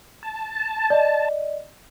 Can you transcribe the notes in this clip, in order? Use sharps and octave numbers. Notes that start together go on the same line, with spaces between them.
A5
D5 D#5